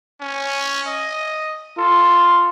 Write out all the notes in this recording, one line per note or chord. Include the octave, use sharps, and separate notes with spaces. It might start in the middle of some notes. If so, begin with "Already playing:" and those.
C#4
D#5
F4 A4